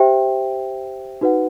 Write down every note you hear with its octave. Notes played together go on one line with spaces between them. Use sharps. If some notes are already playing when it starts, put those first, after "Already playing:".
Already playing: G4 C5 E5 G5
D#4 F#4 B4 F#5